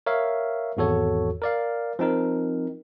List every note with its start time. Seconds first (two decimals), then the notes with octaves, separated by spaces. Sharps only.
0.06 A#4 C#5 E5 F5
0.77 G#1 E2 F#4 A4 C#5
1.42 A#4 D5 F5
1.99 F3 C4 D#4 A#4